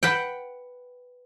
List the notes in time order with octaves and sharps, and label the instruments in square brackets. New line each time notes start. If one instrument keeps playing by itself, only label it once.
[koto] B4 F#5 G5